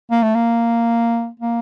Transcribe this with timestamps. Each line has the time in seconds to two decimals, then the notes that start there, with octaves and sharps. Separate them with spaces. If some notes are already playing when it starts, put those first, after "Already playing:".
0.11 A#3
0.23 A3
0.35 A#3
1.40 A#3